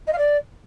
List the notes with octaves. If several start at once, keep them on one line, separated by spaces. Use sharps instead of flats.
D#5
F5
D5